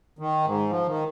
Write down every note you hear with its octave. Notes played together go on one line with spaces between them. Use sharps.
D#3
G#2
F3
D#3